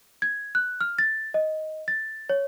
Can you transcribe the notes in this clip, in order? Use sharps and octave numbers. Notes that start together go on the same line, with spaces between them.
G#6
F#6
F6
A6
D#5
A6
C#5